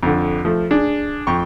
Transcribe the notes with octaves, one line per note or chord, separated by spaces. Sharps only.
F2 D3
F3 A3
D4 G#4
F2 G5 C#6